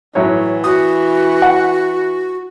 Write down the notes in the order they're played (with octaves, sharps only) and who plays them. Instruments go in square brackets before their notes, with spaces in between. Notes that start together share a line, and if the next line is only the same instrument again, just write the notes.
[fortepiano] A2 F#3 C#5 [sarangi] E3
[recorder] F#4 [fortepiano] D#6
[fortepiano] F#5